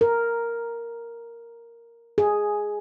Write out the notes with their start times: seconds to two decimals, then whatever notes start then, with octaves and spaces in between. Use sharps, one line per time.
0.01 A#4
2.18 G#4